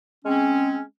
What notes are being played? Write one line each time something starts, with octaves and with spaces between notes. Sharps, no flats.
G#3 C4 C#4